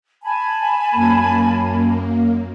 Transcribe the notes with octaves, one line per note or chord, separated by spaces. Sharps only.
G#5 A5 B5
F#2 A#3